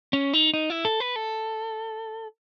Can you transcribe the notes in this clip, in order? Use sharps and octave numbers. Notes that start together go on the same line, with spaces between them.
C#4
D#4
D#4
E4
A4
B4
A4